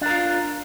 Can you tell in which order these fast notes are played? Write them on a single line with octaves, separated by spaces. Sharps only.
D4 A#4 F4